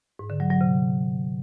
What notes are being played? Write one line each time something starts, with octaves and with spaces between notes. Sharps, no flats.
G#2
D3
F#3
F#3
C3